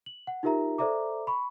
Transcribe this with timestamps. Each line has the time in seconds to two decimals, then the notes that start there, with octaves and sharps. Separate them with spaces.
0.06 F#7
0.27 F#5
0.43 D#4 F4 G4 A#4 E5 A#5
0.78 A4 C5 D5 E5 A#5 D6
1.27 B5 C#6